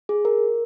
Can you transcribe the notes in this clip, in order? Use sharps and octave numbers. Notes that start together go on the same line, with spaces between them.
G#4
A#4